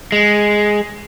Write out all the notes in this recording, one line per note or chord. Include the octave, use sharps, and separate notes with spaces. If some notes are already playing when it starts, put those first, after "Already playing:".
G#3